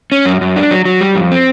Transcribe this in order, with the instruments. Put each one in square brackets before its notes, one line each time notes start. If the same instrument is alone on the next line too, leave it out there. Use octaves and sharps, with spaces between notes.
[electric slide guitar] C#4
F#2
F#2
D4
F#3
F#3
G3
F2
C4